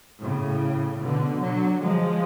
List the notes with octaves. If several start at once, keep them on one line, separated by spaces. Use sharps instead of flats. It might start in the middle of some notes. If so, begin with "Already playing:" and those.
A2 C#3
B2 D3
D3 F#3
F3 G#3